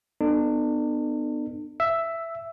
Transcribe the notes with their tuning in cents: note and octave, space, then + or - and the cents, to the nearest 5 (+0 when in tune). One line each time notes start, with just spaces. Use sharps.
B3 +0 D4 +40 A4 +20
E5 +10 E6 +0